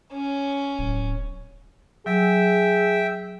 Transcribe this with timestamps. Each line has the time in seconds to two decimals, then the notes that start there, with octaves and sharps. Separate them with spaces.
0.12 C#4
0.79 D1
2.06 F#3 G#4 E5 G5